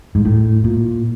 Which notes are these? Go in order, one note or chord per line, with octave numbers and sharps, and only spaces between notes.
G#2
A2
A#2